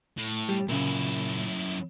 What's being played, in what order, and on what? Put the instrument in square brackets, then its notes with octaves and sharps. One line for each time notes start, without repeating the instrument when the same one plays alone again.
[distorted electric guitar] A2
[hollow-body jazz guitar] G3
[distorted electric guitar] F#2 E4 [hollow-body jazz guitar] A#2 C#3